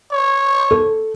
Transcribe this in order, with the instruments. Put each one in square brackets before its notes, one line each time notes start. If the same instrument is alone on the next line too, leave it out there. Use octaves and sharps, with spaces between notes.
[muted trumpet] C#5
[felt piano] A4